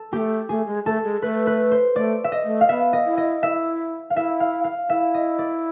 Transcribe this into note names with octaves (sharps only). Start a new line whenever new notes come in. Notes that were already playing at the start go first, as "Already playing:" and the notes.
Already playing: A4
A3 A#3 G4
A3 G#4
G#3
A3 A4
G#3
A3 B4
B4
C5
A3 D5
E5
D#5
A3
F5
B3 E5
D#5
E4
D#5
E4 E5
F5
E4 E5
F5
F5
E4 E5
D#5
D5